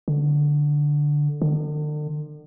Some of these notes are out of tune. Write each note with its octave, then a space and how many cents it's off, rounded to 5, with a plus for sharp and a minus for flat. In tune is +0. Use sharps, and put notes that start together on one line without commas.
D3 +0
D3 +40